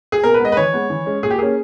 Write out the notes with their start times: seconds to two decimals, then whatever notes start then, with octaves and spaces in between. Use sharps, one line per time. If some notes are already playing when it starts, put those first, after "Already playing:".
0.12 G#4
0.24 B2 A#4
0.34 B4
0.40 G#3 B3 D#5
0.52 B4
0.57 E3 C#5
0.74 G#3 B3
0.90 E3
1.06 G#3 C#4
1.23 A#2 G#4
1.31 G4
1.39 A#3 C#4 G#4